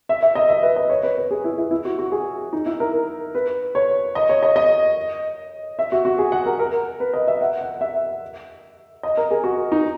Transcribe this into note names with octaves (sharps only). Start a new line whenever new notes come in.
E5
E5
D#5
E5
B4
D#5
C#5
B4
B4
G#4
E4
E4
E4
F#4
F#4
G#4
D#4
E4
A#4
B4
C#5
D#5
C#5
D#5
D#5
E5
F#4
F#4
G#4
F#5
A#4
A#4
B4
D#5
E5
F#5
F#5
E5
D#5
A#4
G#4
F#4
D#4